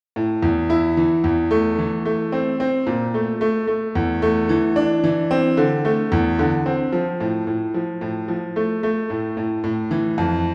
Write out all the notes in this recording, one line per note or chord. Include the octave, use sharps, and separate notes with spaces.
A2
E2
E4
E3
E2
A3
E3
A3
C4
C4
A#2
A3
A3
A3
E2
A3
E3
D4
E3
C4
D3
A3
E2
D3
C4
F3
A2
A2
F3
A2
F3
A3
A3
A2
A2
A2
E3
F2